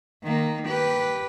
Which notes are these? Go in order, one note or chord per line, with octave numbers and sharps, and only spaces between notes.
D#3 A#3
G4 B4